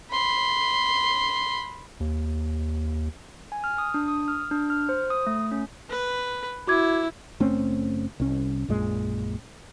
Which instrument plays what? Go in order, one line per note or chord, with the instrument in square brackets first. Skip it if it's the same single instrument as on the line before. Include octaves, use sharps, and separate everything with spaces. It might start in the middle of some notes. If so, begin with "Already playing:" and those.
[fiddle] B5 C6
[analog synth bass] D#2
[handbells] G#5
F6
D#6
D4
D#6
F6
D4
F6
C5
D#6
A3
C#4
[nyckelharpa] B4
[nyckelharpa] E4 [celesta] F#4 D6 G#6
[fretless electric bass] F#1 A3 C4 C#4
C2 C#4
A#1 F#2 A#2 G#3